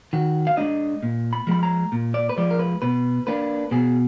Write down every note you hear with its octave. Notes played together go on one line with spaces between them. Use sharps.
D#3 F#4
F5
G#3 D4 D#5
A#2
B5
F3 G#3 B5
A#5
A#2
D5
B4
F3 G#3 D5
A#4
B4
B2 B4
A#3 D4 B4
B2 G#4